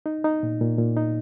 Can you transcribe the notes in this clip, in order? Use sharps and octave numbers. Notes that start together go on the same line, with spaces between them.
D#4
D#4
A#2
A#2
A#2
D#4